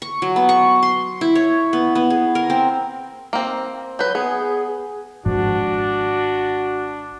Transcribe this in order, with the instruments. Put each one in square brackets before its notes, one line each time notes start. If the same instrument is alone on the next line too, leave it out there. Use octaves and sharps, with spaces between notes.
[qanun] C#6
F#3
B3
C#6
C6
E4
C#5
B3
B3
G#4
A#4
C4
[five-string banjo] A#3 C4
[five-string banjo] F#3 B4 [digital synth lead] G6
[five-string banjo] B3 [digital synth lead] G#4
[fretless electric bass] G#1 G#2 F3 [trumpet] D4 [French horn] F#4